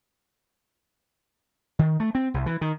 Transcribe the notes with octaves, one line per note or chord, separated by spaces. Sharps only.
D#3
A3
C4
C2
E3
D#3